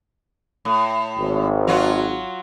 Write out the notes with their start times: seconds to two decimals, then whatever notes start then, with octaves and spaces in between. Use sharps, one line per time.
0.65 A2
1.18 G#1
1.67 F#3 F4 F#4